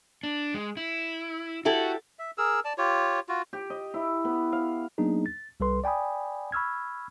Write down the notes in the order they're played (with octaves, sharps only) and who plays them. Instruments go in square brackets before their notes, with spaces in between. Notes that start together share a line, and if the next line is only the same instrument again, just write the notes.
[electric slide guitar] D4
G#3
E4
[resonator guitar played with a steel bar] E4 G4 A4 [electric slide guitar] F#4
[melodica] E5
G#4 A#4 E6
D5 A5
F4 G4 C#5
F4 F#4
[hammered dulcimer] G4
D#5
E4
B3
F5
[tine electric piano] F#3 A#3 B3 D4 D#4 G#4
A6
C2 G3 A4 B4 C6
D5 G5 G#5 B5 D#6
B5 C#6 E6 F6 G#6